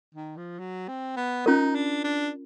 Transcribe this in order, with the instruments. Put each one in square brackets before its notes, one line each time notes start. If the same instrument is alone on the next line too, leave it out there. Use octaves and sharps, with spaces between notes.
[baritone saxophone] D#3
F3
F#3
C4
B3
[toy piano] C#4 F4 A#4 [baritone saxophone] D#4
[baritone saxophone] D4
D4